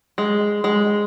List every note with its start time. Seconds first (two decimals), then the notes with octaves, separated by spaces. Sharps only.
0.18 G#3
0.64 G#3